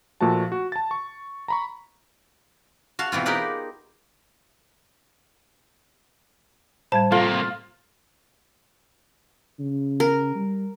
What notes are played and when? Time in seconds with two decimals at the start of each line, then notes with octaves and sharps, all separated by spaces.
0.21 A#2 F3 A3 F#4 A5
0.52 F#4
0.72 A5 A6
0.91 C#6
1.48 A#5 B5 C#6
2.99 F#4 F5 A5
3.12 B2 E3 C4 F4
3.25 D#4 G4 G#4 A#4 B4 D5
6.92 A2 G3 C5 A5 G#6
7.12 C3 A#3 F4 A4
9.59 C#3
10.00 A#4
10.35 G3